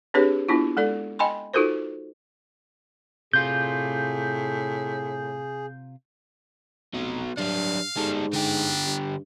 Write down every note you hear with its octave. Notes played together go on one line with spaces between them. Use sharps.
C4 D4 G4 G#4 B4 C#5
B3 D4 E4 F4
G#3 A4 D5
D#5 G5 G#5 B5 C6
D#4 F4 F#4 A4 A#4 C5
A2 C3 F4 G#4 G6
F1 F#3 B3
G2 F#3 D4 F5
G#2 G3 A4
D3 D4 G4
G2